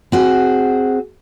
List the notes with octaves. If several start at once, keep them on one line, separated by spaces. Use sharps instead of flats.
C4 F#4 G#4